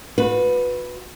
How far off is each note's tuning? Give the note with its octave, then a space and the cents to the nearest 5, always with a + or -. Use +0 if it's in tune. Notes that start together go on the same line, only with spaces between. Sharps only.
F#4 -40 B4 +0